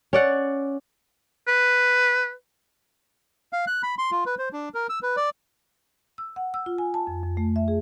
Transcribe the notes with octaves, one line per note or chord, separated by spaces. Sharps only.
C#4 D5 F#5
B4
F5
F#6
B5
C6
F4
B4
C5
D4
A#4
E6
B4
D5
E6
F#5
E6
F4
G#5
A5
F2
F2
A3
E5
G#4